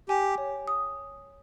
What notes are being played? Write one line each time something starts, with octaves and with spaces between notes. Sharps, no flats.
G4 G#5
C#5
D#6